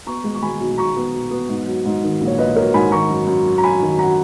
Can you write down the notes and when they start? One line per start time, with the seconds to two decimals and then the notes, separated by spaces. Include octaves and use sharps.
0.07 B3 A#5 C#6
0.24 G#3
0.34 C#6
0.42 G#3 G#5 B5
0.60 B1
0.78 B1 A#5 C#6
0.96 B3
1.14 B2
1.31 B3
1.49 G#2
1.67 F#3
1.85 G#2
2.03 D#3
2.21 A#1
2.27 C#5
2.38 A#1 B4 D#5
2.56 F#3 A#4 C#5
2.74 G#2 G#5 B5
2.92 D#3 A#5 C#6
3.10 F#2
3.27 F#2
3.45 F#3
3.58 A#5
3.63 F#3 G#5 B5
3.81 D#3
3.98 F#2 F#5 A#5